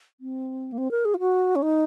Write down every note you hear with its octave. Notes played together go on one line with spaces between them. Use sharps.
C4
A#3
C4
A#4
G#4
F4
F#4
C#4
D#4